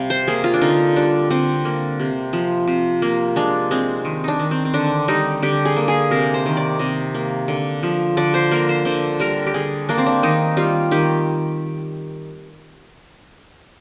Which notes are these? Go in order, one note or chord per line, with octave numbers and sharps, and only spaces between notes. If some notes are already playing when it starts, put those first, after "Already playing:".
Already playing: C3 G3 F5
C5
A#3 G#4
F4
D4
D3 D#4
G3 D4
D3 C4
A#3
C3
F3
C3
A#3
G#3 D4
G#3 C4
D#3
D4 D#4
D#3
C4
C4
D3 D4
G3 D#4
D3 G4
G#4
A#3
G#4
C3 A#4
C5
D#3
D5
C3 D#5
A#3
D3
F3
D3 D5
C5
A#3 A#4
C5
D3 C5
G3 A#4
G4
D3 G#4
A#3 D4
C4
D4
D#3 D#4
G3 F4
D#3 G4